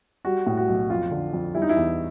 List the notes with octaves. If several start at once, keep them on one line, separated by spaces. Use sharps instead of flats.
G3 F#4
A2
F#4
B1
F2 F4
D3
F2
G3 E4
D#4
E4
E2